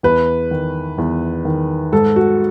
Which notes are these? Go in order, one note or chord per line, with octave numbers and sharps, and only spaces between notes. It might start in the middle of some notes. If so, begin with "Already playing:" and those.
E2 B4
D#3
E2
D#3
G#2 A4
F#4